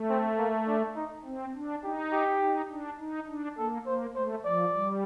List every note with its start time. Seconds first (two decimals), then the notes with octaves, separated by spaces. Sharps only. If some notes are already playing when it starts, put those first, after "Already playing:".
Already playing: A3
0.10 C4
0.38 A#3
0.67 D4
0.96 D#4
1.25 C4
1.55 D4
1.83 D#4 G4
2.12 G4
2.41 D#4
2.70 D4
2.99 D#4
3.28 D4
3.58 A#3 A4
3.86 A#3 C5
4.15 A3 C5
4.45 F3 D5
4.74 G3